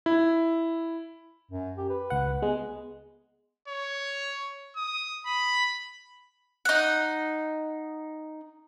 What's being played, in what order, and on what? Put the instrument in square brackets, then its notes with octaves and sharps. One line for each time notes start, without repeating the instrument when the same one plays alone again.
[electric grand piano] E4
[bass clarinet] F#2
G4
B4
[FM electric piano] C#2 F#5
[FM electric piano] G#3 [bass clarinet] B3
[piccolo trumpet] C#5
D#6
B5
[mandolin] D#4 F#5